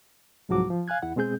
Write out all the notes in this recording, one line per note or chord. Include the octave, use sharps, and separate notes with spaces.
C2 G#2 F3 F#3 F#4 D6
F3
F5 G#5 F#6 G#6
E2 E4 F#5
B2 G#3 C4 G#4 G6